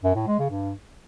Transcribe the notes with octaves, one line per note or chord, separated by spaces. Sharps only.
F#2
A2
G#3
C#3
G2